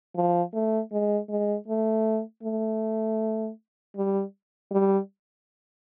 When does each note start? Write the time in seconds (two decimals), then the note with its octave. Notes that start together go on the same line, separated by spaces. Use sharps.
0.16 F3
0.54 A3
0.92 G#3
1.29 G#3
1.68 A3
2.43 A3
3.96 G3
4.72 G3